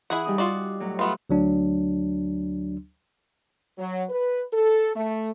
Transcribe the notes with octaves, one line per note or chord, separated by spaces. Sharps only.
E3 E4 G#4 F#5
G3 D#4 D#6
F4 F#4 D5
A2 F#3
A3 B3 F4 B4
D2 F#3 D4
F#3
B4
A4
A3